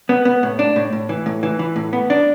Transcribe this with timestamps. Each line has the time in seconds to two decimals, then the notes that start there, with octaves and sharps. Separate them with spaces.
0.09 B3
0.25 B3
0.43 A2
0.59 D4
0.76 A2
0.92 A2
1.09 E3
1.26 A2
1.43 E3
1.59 E3
1.76 A2
1.93 B3
2.10 D4